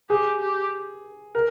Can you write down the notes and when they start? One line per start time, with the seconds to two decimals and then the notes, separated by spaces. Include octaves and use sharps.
0.10 G4 G#4
0.41 G4
1.35 A#4